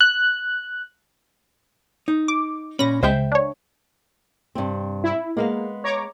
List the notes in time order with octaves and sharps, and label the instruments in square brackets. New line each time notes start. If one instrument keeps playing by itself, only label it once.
[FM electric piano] F#6
[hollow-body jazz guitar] D#4
[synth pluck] D6
[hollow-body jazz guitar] A#2 C#4 [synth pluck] B5 A#6
[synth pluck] C#2 G#3 [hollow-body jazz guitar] C5 E5 G5
[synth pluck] D4 C#5
[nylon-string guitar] G2 C3 C4
[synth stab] E4
[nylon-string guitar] G#3 B3 F5 [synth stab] A#3
[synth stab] C#5 A#5 D6